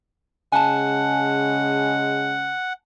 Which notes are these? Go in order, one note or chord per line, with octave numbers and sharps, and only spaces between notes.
C#3 G#3 F#5 G#5 A5